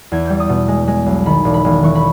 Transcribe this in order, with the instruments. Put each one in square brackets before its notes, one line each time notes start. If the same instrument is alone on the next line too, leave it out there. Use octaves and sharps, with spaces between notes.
[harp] E2 G#6
G3 G6
D#6
B2
G#3
G#3
B1
D#3 B5
E1
B5
E1
E3 C#6
B5